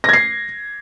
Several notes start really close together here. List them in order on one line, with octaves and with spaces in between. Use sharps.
A#6 G#6 C7